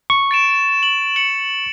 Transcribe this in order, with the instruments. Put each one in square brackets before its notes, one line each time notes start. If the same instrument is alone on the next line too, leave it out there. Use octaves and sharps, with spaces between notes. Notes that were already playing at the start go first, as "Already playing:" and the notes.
[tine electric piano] C#6
[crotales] A6 D7 E7
F#7
C#7 F#7